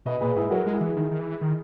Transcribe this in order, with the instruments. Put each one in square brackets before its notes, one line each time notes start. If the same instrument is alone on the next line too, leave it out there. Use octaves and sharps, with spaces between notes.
[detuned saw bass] B2 [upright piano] B4 D#5
[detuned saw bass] A#2 [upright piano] G#4 B4
[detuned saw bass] G#2 [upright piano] E4 G#4
[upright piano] B4
[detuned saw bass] F#3 [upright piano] F#4 A#4
[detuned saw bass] G#3 [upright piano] F#4
[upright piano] E4 G#4
[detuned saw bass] E3
D#3
D#3
E3
D#3